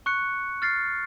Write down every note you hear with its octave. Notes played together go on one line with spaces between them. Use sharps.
C#6 F#6 C#7
F6 A6 C7